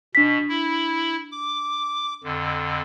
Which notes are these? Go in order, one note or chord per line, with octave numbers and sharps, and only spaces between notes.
B2 D4 B6
E4
D6
F2 D3